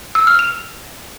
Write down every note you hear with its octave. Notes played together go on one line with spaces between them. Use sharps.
E6
F6
F7